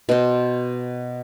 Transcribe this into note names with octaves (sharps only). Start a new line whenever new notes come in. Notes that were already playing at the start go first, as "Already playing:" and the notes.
B2 C5